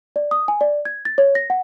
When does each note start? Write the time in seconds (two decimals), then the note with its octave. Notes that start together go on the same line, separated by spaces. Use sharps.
0.16 D5
0.31 D#6
0.48 G#5
0.61 D5
0.85 G#6
1.05 A6
1.18 C#5
1.35 A#6
1.50 F#5